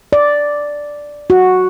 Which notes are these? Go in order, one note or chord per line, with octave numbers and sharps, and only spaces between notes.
D5
F#4